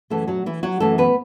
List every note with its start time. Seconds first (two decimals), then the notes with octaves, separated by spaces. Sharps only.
0.10 F#2 E3 A3 A4
0.28 F#3 F#4
0.46 E3 E4
0.63 F#3 F#4
0.80 F#2 E3 A3 A4
0.98 B3 B4